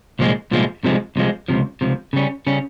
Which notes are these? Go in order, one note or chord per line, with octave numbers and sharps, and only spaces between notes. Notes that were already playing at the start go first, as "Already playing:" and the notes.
C2 A#2 F3 G#3
C2 A#2 F3 G#3
C2 C3 F3 G#3
C2 C3 F3 G#3
C#2 C3 F3
C#2 C3 F3
C#3 G3 C#4
C#3 G3 C#4